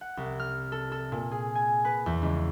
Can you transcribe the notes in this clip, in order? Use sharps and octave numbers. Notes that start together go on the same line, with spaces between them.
F#5
C2
F6
A4
A4
A#2
G#4
G#5
B4
E2
C#2